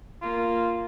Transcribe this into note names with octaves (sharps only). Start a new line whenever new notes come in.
A#3 F4